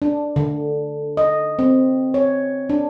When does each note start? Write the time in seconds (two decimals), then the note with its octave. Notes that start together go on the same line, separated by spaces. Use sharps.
0.02 D4
0.36 D3
1.17 D#5
1.59 C4
2.14 C#5
2.69 D4